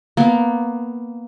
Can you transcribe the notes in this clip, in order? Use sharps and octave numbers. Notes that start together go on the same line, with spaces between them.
A#3 B3